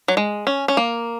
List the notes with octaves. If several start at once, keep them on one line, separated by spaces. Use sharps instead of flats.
F#3
G#3
C#4
C#4
A#3